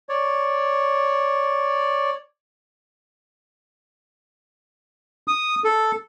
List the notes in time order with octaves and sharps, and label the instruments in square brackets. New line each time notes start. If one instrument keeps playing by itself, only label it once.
[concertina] C#5 D5
[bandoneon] D#6
A4